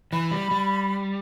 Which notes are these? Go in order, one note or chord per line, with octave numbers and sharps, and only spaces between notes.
E3 B5
G3
G3